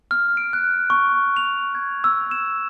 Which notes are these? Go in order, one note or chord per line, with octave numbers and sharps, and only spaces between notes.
F6
D7
F#6
C#6
F7
G#6
E6
E7